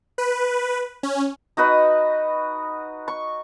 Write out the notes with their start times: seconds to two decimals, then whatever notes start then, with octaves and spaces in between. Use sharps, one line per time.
0.18 B4
1.03 C#4
1.57 D#4 F#4 B4 D#5
3.08 C#6